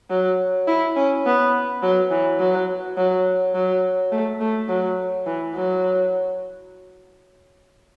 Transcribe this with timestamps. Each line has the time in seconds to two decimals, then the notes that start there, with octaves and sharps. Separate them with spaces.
0.10 F#3
0.67 E4
0.96 C#4
1.26 B3
1.82 F#3
2.11 E3
2.39 F#3
2.97 F#3
3.55 F#3
4.12 A3
4.40 A3
4.68 F#3
5.26 E3
5.55 F#3